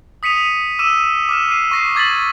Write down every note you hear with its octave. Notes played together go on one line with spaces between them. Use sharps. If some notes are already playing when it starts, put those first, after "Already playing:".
D#6 B6 C#7 D#7 F7
D6 E6 D#7 E7
D6 F6 E7
D6 C7 D#7
C#6 A#6 C7
D6 G#6 A6 B6 F#7